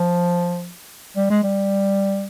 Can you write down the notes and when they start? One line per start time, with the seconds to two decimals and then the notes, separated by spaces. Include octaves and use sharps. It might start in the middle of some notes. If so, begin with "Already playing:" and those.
Already playing: F3
1.17 G3
1.30 G#3
1.43 G3